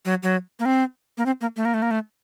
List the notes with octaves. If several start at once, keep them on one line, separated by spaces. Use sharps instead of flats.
F#3
F#3
A#3
C4
A#3
C4
A#3
A3
A#3
A3
A#3
A3